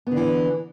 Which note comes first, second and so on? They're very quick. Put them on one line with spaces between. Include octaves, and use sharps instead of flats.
B3 D3 E3